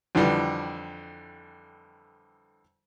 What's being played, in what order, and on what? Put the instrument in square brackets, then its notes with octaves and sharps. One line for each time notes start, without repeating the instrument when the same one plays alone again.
[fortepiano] F2 D3 E3 G3